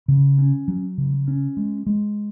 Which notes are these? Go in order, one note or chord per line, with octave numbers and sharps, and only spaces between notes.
C#3
C#4
F#3
C#3
C#4
G#3
G#3